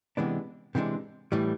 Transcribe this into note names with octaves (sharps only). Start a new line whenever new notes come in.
C3 E3 G#3 B3 D4
C3 E3 G#3 B3 D4
A2 E3 G3